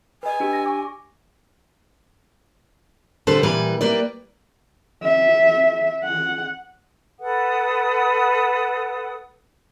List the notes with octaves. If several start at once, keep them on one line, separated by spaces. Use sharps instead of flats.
B4 D#5 G#5
D4 G4 E6
A#6
C#6 D6
D3 G3 A4 B4 C5
A#2 E3 G3 B4
G3 A#3 B4 D5
E5
F#5
A4 B4 F#5 D#6